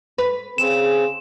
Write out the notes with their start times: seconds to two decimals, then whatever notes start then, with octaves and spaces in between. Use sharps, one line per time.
0.18 B4
0.58 C#3 C4 G#4 E7